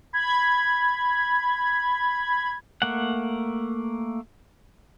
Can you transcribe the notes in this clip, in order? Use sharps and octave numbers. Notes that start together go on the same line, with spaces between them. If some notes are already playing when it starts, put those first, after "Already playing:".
B5 G#6
A3 A#3 F#5